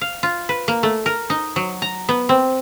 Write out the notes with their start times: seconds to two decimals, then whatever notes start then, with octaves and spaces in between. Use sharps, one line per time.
0.01 F5
0.23 F4
0.49 B4
0.68 A#3
0.83 A3
1.06 A#4
1.30 D#4
1.56 F#3
1.82 A#5
2.09 B3
2.29 C4